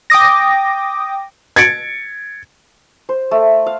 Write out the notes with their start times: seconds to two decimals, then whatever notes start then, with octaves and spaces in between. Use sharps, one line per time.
0.10 G5 D6 D#6 A#6
1.56 G#6 A6 C#7 D7
3.09 C5
3.31 A3
3.66 F5